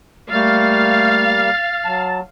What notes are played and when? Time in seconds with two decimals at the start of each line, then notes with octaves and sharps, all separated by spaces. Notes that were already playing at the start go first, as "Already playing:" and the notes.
0.31 G3 A3 A#3 F5 A6
1.85 F#3 A5